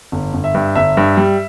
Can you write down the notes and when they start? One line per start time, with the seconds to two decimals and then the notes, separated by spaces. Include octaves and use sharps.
0.12 G1
0.34 G1
0.44 E5
0.54 G2
0.75 G1 E5
0.97 G2
1.17 G3